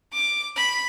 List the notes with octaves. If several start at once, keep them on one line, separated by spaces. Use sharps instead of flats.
D6
B5